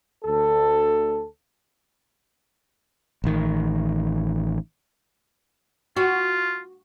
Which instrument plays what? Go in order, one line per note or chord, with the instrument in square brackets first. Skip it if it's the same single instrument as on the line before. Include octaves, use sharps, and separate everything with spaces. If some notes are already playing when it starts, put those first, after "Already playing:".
[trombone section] D2 A4
[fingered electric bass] A1 D#3
[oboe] F4 [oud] F#4